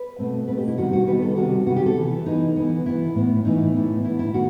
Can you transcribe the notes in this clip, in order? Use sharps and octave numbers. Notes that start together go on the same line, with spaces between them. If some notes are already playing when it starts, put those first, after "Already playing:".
Already playing: B4
B2 A3 C4
B2 A3 C4 B4
G4
E4
C3 D#3 G3 B3 F#4
F#4
C3 D#3 G3 B3 B4
A4
C3 D#3 G3 B3 F#4
C3 D#3 G3 B3 F#4
G4
A4
E3 B3
E3 B3 D#4
E3 B3
E3 B3 E4
A2 E3 B3
A2 E3 B3 D#4
A2 E3 B3
A2 E3 B3 E4
E4
D#3 A3 F#4